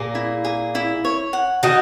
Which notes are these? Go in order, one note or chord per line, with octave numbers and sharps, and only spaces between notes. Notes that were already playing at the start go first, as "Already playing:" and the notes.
Already playing: A#2 A#3 G#4
E4
G#4
E4
C#5
F#5
D#3 D#4 F#4